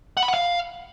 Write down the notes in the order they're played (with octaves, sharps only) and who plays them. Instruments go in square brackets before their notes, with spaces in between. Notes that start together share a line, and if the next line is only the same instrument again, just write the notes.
[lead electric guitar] F#5
B5
F#5
F5